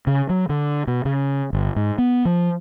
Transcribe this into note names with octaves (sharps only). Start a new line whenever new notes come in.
C#3
F#3
D3
B2
C#3
G1
G#2
B3
F3